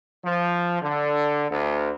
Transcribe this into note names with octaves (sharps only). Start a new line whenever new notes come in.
F3
D3
D2